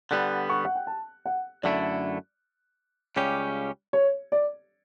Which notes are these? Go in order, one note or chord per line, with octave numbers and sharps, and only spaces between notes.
D3 G3 B3 F#6
C#6
F#5
G5
A5
F#5
F#2 D3 A3 E4 D5
C#2 C#3 G3 C#4 G4
C#5
D5